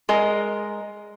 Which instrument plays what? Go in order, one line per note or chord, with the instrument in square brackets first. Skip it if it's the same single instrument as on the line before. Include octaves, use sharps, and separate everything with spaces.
[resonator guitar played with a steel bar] G#3 A#4 D#5